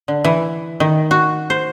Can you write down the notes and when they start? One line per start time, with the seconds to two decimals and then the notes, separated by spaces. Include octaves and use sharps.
0.08 D3
0.24 E3
0.80 D#3
1.11 F#4
1.50 C5